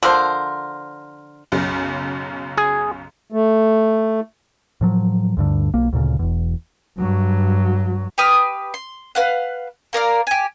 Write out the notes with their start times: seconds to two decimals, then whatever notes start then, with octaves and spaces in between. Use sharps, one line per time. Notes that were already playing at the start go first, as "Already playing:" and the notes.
0.03 D3 F3 A#4 C5
1.52 B1 F#2 C#3
2.58 G#4
3.32 A3
4.81 A2 F3 F#3
5.37 D2 G2 D3
5.74 B1 A#3
5.93 D2 A#2 C#3
6.19 E1 E2
6.98 G2 F#3
8.18 G4 B4 D#6 F6
8.74 C6
9.15 B4 F5 F#5
9.93 A#3 A#4 D5 F5
10.27 G4 G#5